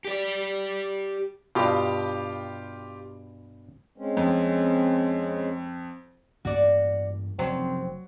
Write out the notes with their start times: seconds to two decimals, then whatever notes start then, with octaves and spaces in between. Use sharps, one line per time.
0.05 G4 D5
1.55 G2 B2 F4 G4
3.98 G#3 C4 C#4
4.17 F2
6.45 A1 G2 A#3 F#4 D5
7.39 F1 F#2 C#3 F#3 C4